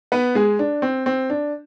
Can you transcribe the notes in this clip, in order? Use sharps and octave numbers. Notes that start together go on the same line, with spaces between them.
B3 B4
G#3 G#4
D4
C4
C4
D4